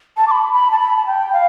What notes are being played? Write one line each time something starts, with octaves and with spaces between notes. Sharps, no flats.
A5
D6
B5
B5
A5
B5
A5
G5
F5